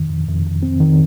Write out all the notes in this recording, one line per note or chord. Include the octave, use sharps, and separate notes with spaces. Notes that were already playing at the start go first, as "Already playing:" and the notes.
Already playing: F2 D#3
F2
F2
F2
C4
D#3